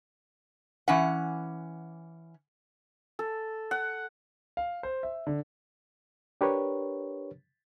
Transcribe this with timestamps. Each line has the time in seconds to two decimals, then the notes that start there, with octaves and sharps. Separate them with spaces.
0.88 E3 C#4 F#5
3.19 A4
3.71 F#5
4.57 F5
4.83 C5
5.03 E5
5.27 D3
6.41 D4 G4 A#4 B4 C#5